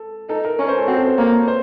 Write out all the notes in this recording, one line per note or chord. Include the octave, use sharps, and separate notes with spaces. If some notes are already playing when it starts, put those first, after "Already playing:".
Already playing: A4
D#4 A4
A#4
C#4 A#4
C5
A4
C4 F#4
A4
C5
A#3 C#5
C5